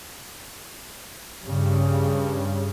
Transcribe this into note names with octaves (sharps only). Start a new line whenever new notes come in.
G2 C#3